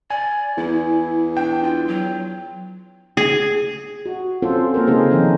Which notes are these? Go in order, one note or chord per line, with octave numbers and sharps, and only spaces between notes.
D5 G#5
E2 E4
D4 G5
F4
F#3
G#4
F#4
C4 C#4 F4 A4 C5
A#3 A4 A#4
C#3 A3 C4 D#4 G#4 C5
D#3 F3 C#4 D#4